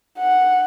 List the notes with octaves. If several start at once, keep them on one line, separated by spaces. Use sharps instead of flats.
F#5